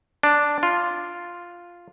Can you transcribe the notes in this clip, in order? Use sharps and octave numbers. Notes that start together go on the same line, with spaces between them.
D4
F4